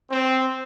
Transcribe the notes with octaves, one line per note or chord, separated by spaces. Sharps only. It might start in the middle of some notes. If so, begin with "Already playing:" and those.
C4